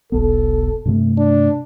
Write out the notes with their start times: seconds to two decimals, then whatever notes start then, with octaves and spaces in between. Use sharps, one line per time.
0.12 E1 B1 B3 A4
0.85 G2 C3 A3
1.18 D4